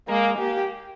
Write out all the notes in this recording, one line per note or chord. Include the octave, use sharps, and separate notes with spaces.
G#3 A#3
A#3 G4